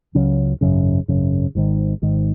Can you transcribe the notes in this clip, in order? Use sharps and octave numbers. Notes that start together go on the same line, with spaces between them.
C#2 C#3 F#3 C#4
G#1 F#2 C#3
G#1 F#2 C#3
G#1 G#2 D#3
G#1 G#2 D#3